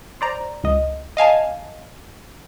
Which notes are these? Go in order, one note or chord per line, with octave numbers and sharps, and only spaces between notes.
C5 D5 A#5
C#2 D#5
D#5 F5 G#5 A5